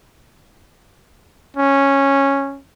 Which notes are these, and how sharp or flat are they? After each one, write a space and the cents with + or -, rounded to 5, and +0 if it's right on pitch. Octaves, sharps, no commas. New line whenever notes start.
C#4 -5